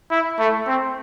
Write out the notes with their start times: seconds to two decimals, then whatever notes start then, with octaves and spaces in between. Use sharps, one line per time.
0.11 E4
0.40 A3
0.67 C4